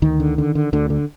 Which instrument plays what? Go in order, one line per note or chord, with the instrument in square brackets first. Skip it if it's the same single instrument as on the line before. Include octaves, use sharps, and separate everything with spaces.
[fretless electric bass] D2 D#3
D3
D3
D3
D2 D3
D3